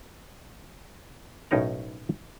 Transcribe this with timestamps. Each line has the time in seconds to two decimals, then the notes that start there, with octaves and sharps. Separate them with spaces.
1.51 B1 A2 C#4 D#4 A#4 A#5